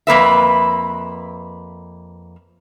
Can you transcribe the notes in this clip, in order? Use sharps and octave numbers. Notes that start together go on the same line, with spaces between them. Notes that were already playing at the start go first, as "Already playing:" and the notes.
F2 A#3 B4 E5